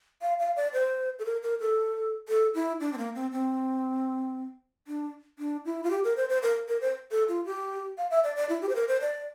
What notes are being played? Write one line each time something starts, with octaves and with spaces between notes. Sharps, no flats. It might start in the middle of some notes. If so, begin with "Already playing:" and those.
F5
F5
D5
C5
A4
A#4
A#4
A4
A4
E4
D4
C4
A#3
C4
C4
D4
D4
E4
F4
G4
A#4
C5
C5
A#4
A#4
C5
A4
F4
G4
F5
E5
D5
D5
E4
G4
C5
A#4
C5
D5